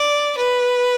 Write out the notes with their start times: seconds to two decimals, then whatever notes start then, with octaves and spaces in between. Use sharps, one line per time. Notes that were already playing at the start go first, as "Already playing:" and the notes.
Already playing: D5
0.37 B4